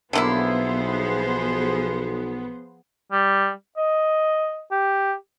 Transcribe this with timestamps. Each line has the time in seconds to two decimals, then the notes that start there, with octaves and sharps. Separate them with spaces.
0.13 B1 D3 F3 A#3 B3 E4 G#4 C5
3.11 G3
3.77 D#5
4.71 G4